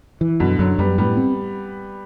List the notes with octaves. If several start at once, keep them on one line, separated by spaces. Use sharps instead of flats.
E3
F#2 B2 D3
F#2 D3 F#3
F#2 G3 B3
A2 G3 B3
C4